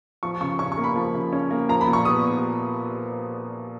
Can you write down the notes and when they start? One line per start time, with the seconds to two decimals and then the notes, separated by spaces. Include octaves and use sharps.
0.23 F3 C#6
0.41 C#3 C#6
0.59 C#4 C#6
0.72 C#6
0.77 A#3
0.84 B5
0.96 F3
1.14 C#3
1.33 C#4
1.51 A#3
1.69 F3 A#5
1.81 B5
1.88 A#2
1.93 C#6
2.05 B3 D#6